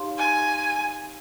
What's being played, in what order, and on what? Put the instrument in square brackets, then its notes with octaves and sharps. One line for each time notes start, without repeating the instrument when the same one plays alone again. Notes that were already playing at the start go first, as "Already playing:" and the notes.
Already playing: [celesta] D#4 G4 C#5 F5 C6
[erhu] G#5